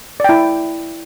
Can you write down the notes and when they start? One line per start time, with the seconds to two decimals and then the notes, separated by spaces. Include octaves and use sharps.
0.20 D5
0.24 G5
0.29 E4